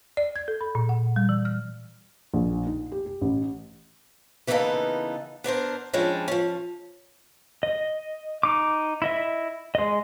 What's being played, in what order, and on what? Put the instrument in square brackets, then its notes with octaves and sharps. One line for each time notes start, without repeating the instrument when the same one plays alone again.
[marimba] D5
G#6
A4
B5
A#2
F#5
G3
E3
F6
[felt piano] A#1
D#4
G4
G4
A1
[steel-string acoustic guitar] C#3 E3 A#3 B3 D#4 A4
B3 D4 A#4 C5
F3 G3 G#3 C#4 D4
F3 C#4
[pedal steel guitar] D#5
D#4 D6
E4 D#5 E5
G#3 D#5